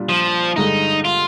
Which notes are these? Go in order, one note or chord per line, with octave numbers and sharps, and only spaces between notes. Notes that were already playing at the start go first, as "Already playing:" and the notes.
Already playing: A#2 G3 D4 F4
F3
G2 D3 G#3 D#4
F4